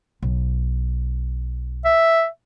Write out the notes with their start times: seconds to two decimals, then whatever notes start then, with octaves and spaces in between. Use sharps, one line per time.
0.22 B1
1.85 E5